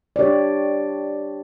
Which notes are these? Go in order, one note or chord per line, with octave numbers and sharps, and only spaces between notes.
D4 G4 C#5 D5